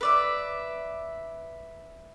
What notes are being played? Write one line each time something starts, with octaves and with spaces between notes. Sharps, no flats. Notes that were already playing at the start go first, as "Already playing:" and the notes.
B4 D5 E5